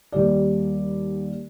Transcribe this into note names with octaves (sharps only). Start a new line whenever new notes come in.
D#2 G3 D5